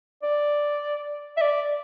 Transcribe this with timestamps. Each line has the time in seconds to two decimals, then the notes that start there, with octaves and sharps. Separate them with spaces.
0.23 D5
1.37 E5
1.41 D5